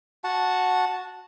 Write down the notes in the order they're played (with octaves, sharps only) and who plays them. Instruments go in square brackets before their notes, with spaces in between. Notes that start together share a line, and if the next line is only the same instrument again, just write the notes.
[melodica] F#4 F#5 A5